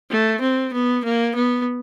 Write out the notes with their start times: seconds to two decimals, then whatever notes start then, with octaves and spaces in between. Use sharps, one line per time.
0.11 A3
0.42 C4
0.73 B3
1.05 A#3
1.35 B3